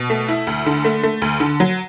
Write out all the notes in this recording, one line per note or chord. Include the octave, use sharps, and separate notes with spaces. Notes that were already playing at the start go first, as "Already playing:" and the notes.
Already playing: B2
A3
E4
D2
D3
A3
A3
D2
D3
F#3